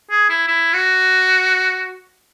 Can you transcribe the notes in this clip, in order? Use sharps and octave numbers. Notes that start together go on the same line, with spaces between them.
G#4
E4
E4
F#4